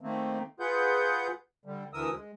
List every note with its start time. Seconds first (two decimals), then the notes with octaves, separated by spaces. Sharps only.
0.01 D#3 A3 A#3 C4
0.60 F4 G#4 B4 F#5 G6
1.65 D3 G3
1.93 D2 D3 E3 A#4 D#6 E6
2.13 G#3